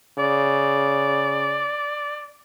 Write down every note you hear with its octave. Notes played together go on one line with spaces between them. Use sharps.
C#3 D5